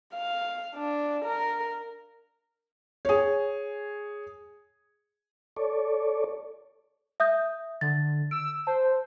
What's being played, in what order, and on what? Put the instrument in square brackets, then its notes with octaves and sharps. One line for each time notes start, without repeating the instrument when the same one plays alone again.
[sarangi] F5
D4
A#4
[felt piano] G#4 C#5
[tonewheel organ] A4 C#5 D5
[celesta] E5 D#6 G6
[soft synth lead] D3 [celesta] A6
[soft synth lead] E6 [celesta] D7
[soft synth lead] C5 [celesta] A5